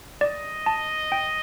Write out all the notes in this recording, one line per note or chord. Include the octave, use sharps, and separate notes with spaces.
D5 D#5
A5
G5